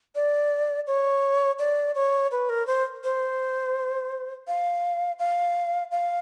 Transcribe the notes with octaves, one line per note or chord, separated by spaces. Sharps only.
D5
C#5
D5
C#5
B4
A#4
C5
C5
F5
F5
F5